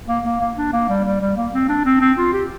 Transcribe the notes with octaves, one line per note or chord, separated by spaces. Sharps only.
A#3
A#3
A#3
D4
A#3
G3
G3
G3
A#3
C4
D4
C4
C4
F4
G4